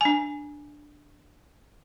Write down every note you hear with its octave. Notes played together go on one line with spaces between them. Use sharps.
D4 G#5